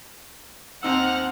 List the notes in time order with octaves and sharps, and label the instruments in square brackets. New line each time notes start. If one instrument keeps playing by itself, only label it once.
[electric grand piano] D#2 D#4 E6 [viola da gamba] C4 [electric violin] F#5 F6